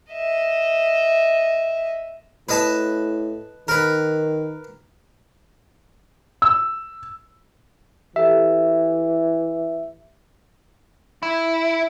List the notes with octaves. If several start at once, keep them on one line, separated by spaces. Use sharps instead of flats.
D#5 E5
A2 B4 D#5 A5
D#3 A#4 B4
E6
E3 G4 A4 E5
E4